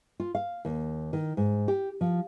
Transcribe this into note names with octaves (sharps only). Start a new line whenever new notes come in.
F4
F5
D#2
D#3
G#2
G4
F3